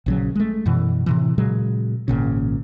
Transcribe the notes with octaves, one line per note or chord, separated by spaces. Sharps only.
A#1 C#3 F#3
G#3 A3
F#2 B2 E3
A2 C3 E3
A#2 C#3 F#3 G#3
G#1 A#2 C#3